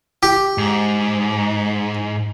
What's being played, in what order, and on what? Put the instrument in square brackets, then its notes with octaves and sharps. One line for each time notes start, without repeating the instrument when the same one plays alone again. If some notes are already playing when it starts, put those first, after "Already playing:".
[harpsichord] G4
[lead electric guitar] G#2